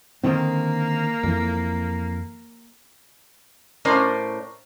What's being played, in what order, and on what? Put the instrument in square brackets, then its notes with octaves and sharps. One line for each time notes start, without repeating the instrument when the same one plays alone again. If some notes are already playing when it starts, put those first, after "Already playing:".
[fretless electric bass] D3 D#3 C4 [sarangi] A#3
[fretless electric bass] F2 E3
[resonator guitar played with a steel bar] A2 C#4 A#4 C5 D5